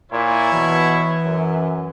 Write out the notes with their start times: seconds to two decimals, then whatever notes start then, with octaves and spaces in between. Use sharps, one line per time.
0.12 A#2 E4 C#5
0.53 B2 E3
1.25 F#2